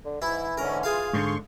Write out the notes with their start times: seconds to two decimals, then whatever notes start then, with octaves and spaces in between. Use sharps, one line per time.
0.05 D3
0.22 G#2 E3 E4
0.58 G#2 D3 C#4 A#4
0.83 F4 G#4 F5
1.13 G#2 D3 C6 C#6